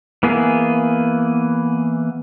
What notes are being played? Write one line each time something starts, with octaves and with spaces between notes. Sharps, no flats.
E3 A#3 B3 G#4